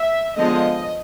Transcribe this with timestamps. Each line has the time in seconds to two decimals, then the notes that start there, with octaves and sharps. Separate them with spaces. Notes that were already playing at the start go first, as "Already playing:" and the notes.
Already playing: E5
0.38 D3 F3 G#3 B3 D#5